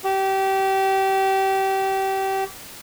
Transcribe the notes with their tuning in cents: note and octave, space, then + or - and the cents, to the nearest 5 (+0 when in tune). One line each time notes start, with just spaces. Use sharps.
G4 -25